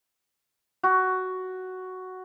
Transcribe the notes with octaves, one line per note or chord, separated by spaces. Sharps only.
F#4